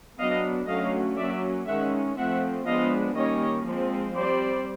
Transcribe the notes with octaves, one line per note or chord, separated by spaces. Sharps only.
F#3 B3 D4 D#5 F5
D3 F#3 A3 C#4 D#5 F5
F#3 A#3 C#4 D5 E5
D#3 G#3 C#4 E5 F#5
F3 A3 C4 E5 F#5
F3 G#3 B3 D4 D#5 F5
D#3 G3 A#3 C#4 C#5 D#5
F3 G#3 C4
G3 C4 C5 D5